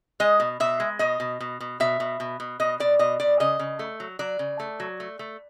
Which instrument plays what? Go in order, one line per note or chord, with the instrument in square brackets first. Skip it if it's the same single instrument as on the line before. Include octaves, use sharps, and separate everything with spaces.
[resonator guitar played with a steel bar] G#3 D#5
B2
B2 E5
G#3
B2 D#5
B2
B2
B2
B2 E5
B2
B2
B2
B2 D#5
B2 D5
B2 D#5
B2 D5
C#3 D#5
C#3
A3
F#3
F#3 D5
C#3
A3
F#3
A3
A3